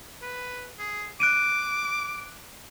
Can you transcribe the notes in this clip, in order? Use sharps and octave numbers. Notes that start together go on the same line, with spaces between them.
B4
G#4
D6 F#6 D7 D#7